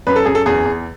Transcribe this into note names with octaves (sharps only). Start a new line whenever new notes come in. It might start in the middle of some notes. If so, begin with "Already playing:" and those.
F#2 B4
A4
F#2 G#4
A4
E2 G#4
E2